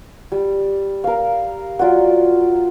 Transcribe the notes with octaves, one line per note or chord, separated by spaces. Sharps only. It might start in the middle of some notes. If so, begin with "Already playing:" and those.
G3
A#4 F5
F#3 F4 D5 F#5